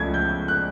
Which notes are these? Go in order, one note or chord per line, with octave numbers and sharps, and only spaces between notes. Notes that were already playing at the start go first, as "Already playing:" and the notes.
Already playing: C#2 C#3 F3 A3 G#6
G6
F#6